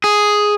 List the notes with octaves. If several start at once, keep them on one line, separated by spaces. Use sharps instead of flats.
G#4